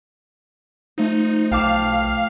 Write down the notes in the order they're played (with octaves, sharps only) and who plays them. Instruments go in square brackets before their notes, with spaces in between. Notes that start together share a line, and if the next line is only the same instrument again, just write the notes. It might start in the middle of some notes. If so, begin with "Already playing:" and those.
[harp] F3 A3 [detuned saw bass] D#4
[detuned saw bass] B1 [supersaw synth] F5 [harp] G5 A5 D6